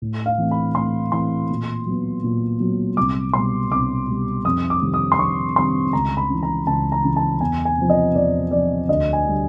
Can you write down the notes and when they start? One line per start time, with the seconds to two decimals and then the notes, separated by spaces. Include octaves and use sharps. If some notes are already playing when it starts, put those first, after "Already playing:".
0.02 A2
0.26 F5
0.38 E3 A3 C4
0.51 B5
0.75 A2 C6
1.12 E3 A3 C4 C6
1.50 A#2
1.86 F#3 B3
2.24 A#2
2.60 F#3 B3
2.97 C2 D6
3.33 B2 G3 C6
3.71 C2 D6
4.07 B2 G3
4.44 F2 D#6
4.70 D6
4.81 C3 D#3 G3 C4
4.94 D#6
5.12 C6
5.18 F2 C#6
5.56 C3 D#3 G3 C4 C6
5.93 C#2 A#5
6.17 B5
6.30 C#3 E3
6.43 A#5
6.67 C#2 A5
6.92 A#5
7.04 C#3 E3
7.16 A5
7.40 E2 G#5
7.65 G#5
7.77 C3 F3
7.89 D#5
8.15 E2 D5
8.51 C3 F3 D5
8.89 D2 D#5
9.13 G#5
9.26 D3 G3